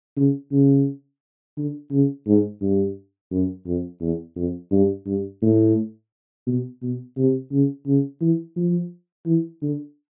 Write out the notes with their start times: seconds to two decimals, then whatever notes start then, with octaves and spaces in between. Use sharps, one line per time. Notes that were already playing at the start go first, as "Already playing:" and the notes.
0.17 C#3
0.52 C#3
1.57 D3
1.91 C#3
2.27 G#2
2.62 G2
3.32 F#2
3.66 F2
4.01 E2
4.36 F2
4.72 G2
5.07 G2
5.42 A2
6.47 B2
6.82 B2
7.17 C3
7.52 C#3
7.87 C#3
8.21 E3
8.56 F3
9.26 E3
9.62 D3